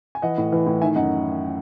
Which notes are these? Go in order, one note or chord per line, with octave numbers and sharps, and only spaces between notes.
G#5
E3 D#5 F#5
A2
E3
A2
D#3 E5 G#5
F#2 D#5 F#5